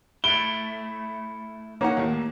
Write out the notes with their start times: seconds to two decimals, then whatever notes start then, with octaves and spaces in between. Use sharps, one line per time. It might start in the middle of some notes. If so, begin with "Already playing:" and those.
0.24 A3 E4 D7 G7
1.81 A#3 C#4 D#4 F#5
1.97 D#2 A2